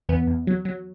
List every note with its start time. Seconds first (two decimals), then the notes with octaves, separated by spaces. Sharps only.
0.09 E2 B3
0.27 E2
0.47 F#3
0.65 F#3